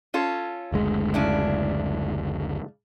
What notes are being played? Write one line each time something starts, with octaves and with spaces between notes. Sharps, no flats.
C#4 F4 A4
F#1 D2 G#3
C#3 D4 E4